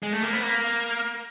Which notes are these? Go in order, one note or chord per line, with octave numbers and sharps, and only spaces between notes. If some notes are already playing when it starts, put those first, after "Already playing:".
G#3
A3
A#3
B3
A#3